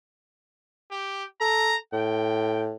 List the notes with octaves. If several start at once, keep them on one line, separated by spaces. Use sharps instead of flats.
G4
A4 A#5
A2 G5